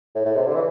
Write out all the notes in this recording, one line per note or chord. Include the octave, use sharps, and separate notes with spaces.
A2
A2
C3
D3
E3